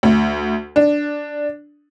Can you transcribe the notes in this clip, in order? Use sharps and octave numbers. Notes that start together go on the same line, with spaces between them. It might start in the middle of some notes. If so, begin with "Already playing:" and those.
D2
D4